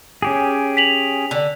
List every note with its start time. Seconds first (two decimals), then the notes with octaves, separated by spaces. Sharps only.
0.22 C#4 G4 G#4
0.77 B6 F7 F#7
1.31 D3